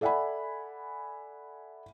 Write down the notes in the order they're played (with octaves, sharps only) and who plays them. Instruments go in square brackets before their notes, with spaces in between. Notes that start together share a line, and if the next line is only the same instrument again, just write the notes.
[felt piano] A4 D5 E5 F#5 G#5 B5